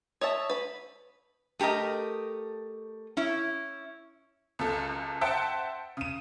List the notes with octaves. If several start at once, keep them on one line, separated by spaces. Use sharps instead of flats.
C#5 D#5 E5 A5
B4 B5
A3 G4 G#4 A#4 D#5
C#4 E4
C#2 F#2 A4
C5 E5 F#5 G5 A5
C#3 D#7